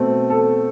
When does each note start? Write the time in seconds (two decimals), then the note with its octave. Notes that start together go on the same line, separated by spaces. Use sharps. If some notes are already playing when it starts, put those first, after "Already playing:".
Already playing: B2 A3 C4
0.30 A4